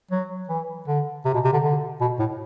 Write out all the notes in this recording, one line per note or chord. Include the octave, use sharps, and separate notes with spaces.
F#3
E3
D3
C3
B2
C3
D3
D3
B2
A2